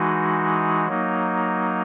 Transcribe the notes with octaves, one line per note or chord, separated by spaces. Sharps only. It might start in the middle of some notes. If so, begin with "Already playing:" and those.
Already playing: E3 G#3 D#4 F#4
F#3 A#3 D#4